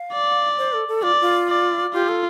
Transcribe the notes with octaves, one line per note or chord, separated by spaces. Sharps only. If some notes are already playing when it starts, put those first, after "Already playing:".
Already playing: F5
D5
C5
A4
A4
F4 D5
F4
D5
F4 G4
A4